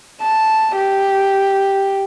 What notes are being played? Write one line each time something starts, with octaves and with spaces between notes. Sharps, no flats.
A5
G4